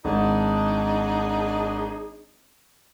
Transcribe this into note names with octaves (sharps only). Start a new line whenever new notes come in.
G#1 D4 D#4 G#4